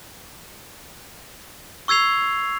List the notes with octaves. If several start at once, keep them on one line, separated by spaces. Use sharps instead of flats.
C#6 E6 G#6 C7 F7